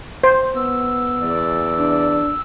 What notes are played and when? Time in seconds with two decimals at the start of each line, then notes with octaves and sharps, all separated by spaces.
0.23 C5
0.55 B3 E6
1.22 E2 D5
1.79 D4